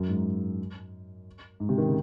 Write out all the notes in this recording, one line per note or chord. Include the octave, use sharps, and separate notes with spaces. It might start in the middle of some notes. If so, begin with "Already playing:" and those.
Already playing: F#2
G#2
G#2
C3
D#3
C#3